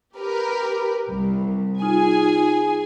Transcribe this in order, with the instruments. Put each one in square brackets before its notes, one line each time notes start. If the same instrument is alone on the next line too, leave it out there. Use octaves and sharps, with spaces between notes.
[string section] G4 A#4 B4
C2
[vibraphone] D#4 F4 [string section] G#4 G#5